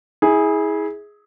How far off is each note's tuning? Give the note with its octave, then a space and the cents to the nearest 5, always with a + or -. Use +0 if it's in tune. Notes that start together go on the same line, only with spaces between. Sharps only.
E4 -30 G#4 +0